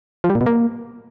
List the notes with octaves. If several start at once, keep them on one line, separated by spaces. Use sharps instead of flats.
F3
G3
A#2
B2
A#3